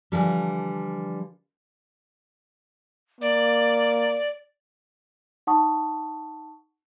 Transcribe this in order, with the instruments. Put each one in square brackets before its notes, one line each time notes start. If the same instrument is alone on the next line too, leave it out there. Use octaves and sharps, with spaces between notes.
[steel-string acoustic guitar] D3 E3 F3 G3
[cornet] A#3 [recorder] D5
[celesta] D#4 F#5 A5 C#6 D#6